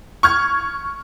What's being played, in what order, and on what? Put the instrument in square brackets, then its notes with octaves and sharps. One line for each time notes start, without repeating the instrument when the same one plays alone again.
[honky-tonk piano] C#6 F6 G#6